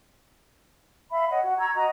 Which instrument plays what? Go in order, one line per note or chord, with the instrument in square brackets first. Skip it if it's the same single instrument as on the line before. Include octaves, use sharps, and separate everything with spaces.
[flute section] E5 F5 B5
C#5 D#5 F#5
F#4 F#5
A#5 C#6 E6 G#6
F#4 D#5 A#5